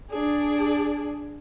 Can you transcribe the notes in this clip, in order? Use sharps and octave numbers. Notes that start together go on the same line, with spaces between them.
D4 G#4